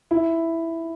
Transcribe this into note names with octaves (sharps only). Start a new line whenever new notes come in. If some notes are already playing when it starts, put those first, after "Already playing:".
E4